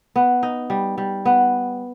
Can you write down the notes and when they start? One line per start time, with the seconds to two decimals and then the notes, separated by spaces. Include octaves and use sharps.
0.16 B3
0.43 D#4
0.70 G3
0.98 G3
1.25 B3